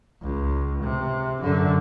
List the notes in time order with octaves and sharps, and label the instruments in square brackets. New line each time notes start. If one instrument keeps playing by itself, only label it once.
[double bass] C#2
C3
F#2 D3